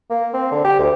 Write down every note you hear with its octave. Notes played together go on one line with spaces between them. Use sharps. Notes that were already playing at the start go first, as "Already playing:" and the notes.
A#3
C4
D3
G4
D2